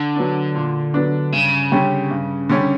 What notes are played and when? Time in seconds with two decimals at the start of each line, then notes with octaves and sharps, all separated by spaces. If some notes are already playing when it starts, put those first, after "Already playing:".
Already playing: D3
0.16 F#3 B3 D4
0.55 A#2
0.94 F#3 B3 D4
1.33 G2 C#3
1.72 D3 G3 C#4 G4
2.11 G2
2.50 D3 G3 C#4 G4